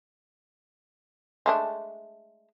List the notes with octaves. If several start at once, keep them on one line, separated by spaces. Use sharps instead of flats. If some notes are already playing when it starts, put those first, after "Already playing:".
G#3 A3 D4